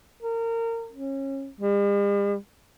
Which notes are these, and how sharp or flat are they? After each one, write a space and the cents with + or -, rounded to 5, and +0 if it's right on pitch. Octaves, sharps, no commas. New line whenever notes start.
A#4 -25
C#4 -30
G3 +45